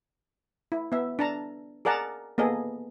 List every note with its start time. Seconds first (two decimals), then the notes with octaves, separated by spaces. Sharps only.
0.72 E4
0.92 B3 E5
1.19 D4 A5 A#5
1.85 G#4 A#4 D5 F#5 A5 A#5
2.38 A#3 B3 G#4 A4 D#5